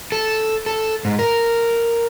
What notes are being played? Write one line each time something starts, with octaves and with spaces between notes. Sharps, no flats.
A4
A4
G#2
A#4